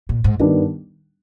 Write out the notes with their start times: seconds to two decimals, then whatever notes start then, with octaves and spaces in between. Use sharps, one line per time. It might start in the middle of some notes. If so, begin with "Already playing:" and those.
0.09 A#2
0.24 G#2
0.39 G2 D#3 G3 B3 D4